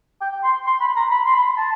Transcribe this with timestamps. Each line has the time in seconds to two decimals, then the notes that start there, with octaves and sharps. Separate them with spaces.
0.21 G5
0.44 C6
0.67 C6
0.81 B5
0.97 A#5
1.11 B5
1.25 C6
1.34 B5
1.57 A5